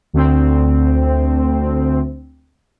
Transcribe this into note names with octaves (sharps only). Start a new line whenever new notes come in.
D2 C4